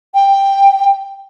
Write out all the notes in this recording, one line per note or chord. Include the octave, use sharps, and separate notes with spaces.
G5